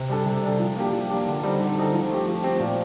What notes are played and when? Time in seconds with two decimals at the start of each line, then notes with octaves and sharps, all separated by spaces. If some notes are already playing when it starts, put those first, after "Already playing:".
Already playing: C3
0.09 G3 D4 A4
0.26 C3
0.42 G3 D4 A4
0.60 F3
0.76 A#3 D4 G4
0.93 F3
1.10 A#3 D4 G4
1.26 D3
1.43 G3 C4 D#4 A4
1.60 D3
1.76 G3 C4 D#4 A4
1.93 F3
2.10 A3 C4 G4
2.27 F3
2.43 A3 C4 G4
2.60 A#2